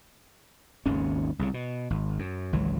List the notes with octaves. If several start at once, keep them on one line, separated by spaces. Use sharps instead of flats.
G#1 D#2 C#3 C#4
C2 C#3
B2
G#1
F#2
G#1 C#2 E3 F#3